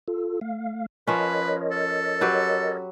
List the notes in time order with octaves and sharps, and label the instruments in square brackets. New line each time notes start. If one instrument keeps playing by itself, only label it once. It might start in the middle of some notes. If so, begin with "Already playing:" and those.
[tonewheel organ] F4 A4
A3 F5
[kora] F3 C#4 [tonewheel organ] A#4 C#5 D#5 [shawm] B4
[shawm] A4
[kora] F#3 G4 B4